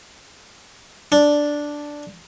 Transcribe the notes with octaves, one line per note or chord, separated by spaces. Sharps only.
D4